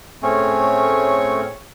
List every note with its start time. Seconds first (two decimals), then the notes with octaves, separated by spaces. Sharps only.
0.22 A2 A3 C4 C#4 G#4 C#5